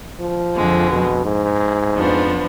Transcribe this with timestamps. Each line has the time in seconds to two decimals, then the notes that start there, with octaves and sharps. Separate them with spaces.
0.20 F3
0.56 F2 D3 G#3
0.90 B2
1.25 G#2
1.96 F2 F3 B3 D4